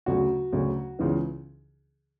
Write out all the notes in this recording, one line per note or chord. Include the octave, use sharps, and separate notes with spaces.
D2 C#3 F#3 F#4
D2 C#3 F#3
C#2 C#3 E3 B3